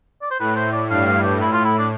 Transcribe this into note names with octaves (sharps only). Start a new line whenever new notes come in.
D5
C5
A2 B4
C5
D5
G2 F5
F5
G4
A2 E4
F4
E4
D4